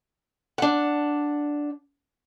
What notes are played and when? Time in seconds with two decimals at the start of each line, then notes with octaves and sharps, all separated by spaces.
0.58 D4 F#5